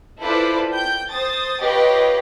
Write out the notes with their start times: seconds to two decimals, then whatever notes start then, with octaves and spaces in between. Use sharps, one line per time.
0.20 E4 F4 A4 B4 C5 D5
0.74 G5 G6
1.09 C5 D#6 A6
1.62 F4 G4 B4 C#5 D#5